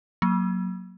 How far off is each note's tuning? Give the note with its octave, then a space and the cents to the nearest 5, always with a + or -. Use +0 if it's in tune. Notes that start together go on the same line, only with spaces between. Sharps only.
F#3 +0 A#3 +0